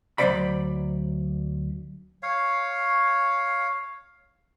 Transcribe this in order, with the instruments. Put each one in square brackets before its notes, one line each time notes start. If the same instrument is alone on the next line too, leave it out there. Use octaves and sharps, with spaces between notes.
[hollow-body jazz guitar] D2 F#3 G#3 C5 D5 B5
[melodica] C#5 F5